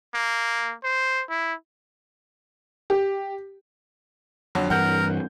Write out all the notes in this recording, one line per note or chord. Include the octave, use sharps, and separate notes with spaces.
A#3
C5
E4
G4
F2 D3 F#3
G2 E3 A#4 F#5 G6